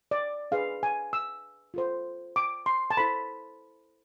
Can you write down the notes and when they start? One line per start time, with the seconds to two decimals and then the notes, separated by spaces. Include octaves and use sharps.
0.11 D5
0.51 D4 G#4 B4 F5
0.83 G#5
1.13 E6
1.74 F4 A4 C5
2.36 D6
2.66 C6
2.91 A5
2.97 E4 A4 C5 B5